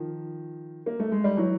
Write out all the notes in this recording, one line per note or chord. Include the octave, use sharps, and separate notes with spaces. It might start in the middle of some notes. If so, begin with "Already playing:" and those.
Already playing: D#3 F3
A#3
A3
G#3
G3
E3 F#3